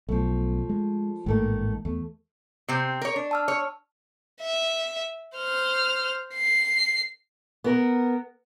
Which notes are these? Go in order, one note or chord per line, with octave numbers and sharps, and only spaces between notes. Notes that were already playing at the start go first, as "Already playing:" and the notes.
B1 F3 A3
G#3
A1 G#2 D#3 A3 A#3
E2 A3
C3 C4
A#4 C#5
D4
A5 E6 F6
C#5
E5
C5 F6
C7
B3 A#4